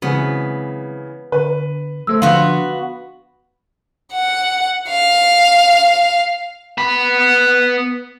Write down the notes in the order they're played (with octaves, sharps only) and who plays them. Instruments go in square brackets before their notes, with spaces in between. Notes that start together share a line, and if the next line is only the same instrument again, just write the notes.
[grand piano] C#3 E3 [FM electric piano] F#3 G#3 C4 [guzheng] B3
[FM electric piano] D3 [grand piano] B4
[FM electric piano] F#3 A3 C5 [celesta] E6
[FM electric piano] D3 F3 D4 [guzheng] B3 F#4 [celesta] F5 [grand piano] C6
[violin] F#5
F5
[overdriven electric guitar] B3 B5